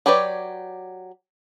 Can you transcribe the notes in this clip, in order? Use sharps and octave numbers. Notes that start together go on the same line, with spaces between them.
F#3 G4 B4 C#5 D5